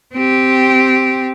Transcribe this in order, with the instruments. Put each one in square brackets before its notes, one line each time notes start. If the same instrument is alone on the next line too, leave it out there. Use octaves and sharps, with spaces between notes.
[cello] C4 G4